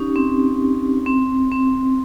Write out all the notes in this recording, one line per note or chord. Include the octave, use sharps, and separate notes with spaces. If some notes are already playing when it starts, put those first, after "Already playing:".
Already playing: C#4 D#4 G4
C4
C4
C4